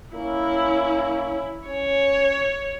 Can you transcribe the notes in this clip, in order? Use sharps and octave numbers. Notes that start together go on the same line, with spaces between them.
A#3 C#4 E4
C#4 C#5